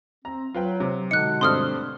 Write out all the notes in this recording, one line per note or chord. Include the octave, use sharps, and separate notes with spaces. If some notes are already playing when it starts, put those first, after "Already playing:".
C4 A#5
F#3 F4 B4 G5
C3
B2 D3 G#3 D#4 F#6 C#7
G2 A3 C4 C6 D#6 F6